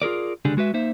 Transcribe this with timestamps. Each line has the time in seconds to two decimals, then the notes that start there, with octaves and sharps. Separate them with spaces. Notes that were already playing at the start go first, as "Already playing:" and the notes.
0.02 F4 G#4 A#4 D5
0.45 C#2 D3 D4 G4 G#4
0.57 G#3 F#4 B4 E5
0.74 A#3 D#4 C5 E5